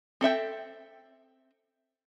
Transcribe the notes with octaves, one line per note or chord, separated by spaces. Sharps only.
C4 A4 E5 G5